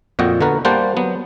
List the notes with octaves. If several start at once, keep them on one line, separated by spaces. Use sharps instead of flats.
F2 A#2 F#4 D#5 F#5 G5
D3 B3 F#4 A#4 B4
G3 A#3 C5 F#5 G5 A5
F#3 B3